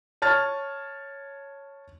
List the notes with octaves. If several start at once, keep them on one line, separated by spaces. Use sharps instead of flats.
C#5 A5 F6 A6